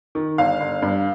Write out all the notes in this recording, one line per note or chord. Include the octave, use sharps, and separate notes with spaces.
D#3
G1 F5
G1
G2